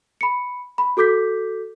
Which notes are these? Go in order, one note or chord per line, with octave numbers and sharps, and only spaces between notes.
B5 C#7
B5
F#4 A4 D6 G6 B6